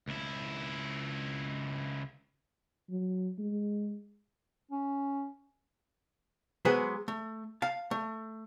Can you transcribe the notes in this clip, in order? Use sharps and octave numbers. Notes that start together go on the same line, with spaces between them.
C#2 E4
F#3
G#3
C#4
F#3 G#3 B3 G#4 B4 C5
A3
F5 A5
A3